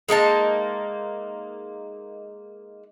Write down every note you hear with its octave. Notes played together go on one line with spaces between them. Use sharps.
G#3 A#3 D#4 A5